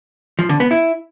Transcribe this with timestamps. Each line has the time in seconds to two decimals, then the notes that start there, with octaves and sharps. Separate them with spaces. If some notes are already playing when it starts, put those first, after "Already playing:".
0.39 F3
0.49 D3
0.60 B3
0.71 E4